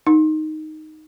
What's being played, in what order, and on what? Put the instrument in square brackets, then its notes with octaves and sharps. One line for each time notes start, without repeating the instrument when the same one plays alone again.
[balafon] D#4